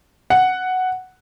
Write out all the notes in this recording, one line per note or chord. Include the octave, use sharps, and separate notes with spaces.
F#5